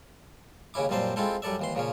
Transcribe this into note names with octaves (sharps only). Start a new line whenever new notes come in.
D#2 C#3 C#4 E4 D6
F#2 A#2 G3 C4 C5 A5
G#3 C4 E4 F4 A4 G5
F#2 G3 A4 D5 E5
D#2 E3 C6
A#2 C#3 F3 C#4